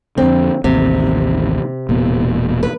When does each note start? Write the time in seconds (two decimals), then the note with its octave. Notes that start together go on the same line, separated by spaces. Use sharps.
0.18 F2 D3 C4
0.64 A1 D#2 C3
1.89 E1 A#2 B3
2.63 B4